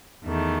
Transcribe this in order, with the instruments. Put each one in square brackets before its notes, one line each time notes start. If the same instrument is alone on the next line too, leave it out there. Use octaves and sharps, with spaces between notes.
[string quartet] E2 D#3 A3